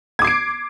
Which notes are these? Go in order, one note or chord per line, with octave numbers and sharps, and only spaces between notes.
D6 G#6 C7 D7